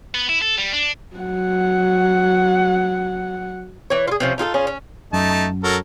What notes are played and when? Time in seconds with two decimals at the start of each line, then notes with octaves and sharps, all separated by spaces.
0.14 B3
0.29 E4
0.42 A4
0.58 G3
0.73 D4
1.16 F#3 F#5
3.90 E3 C#5
4.08 F4 G#4
4.20 C3 F3 C#4
4.38 D#4 F4 G#4 A4
4.54 C#4 F4 G#4
4.67 C#4
5.13 F#2 A3 D#4 A5
5.64 F#3 A4 A#4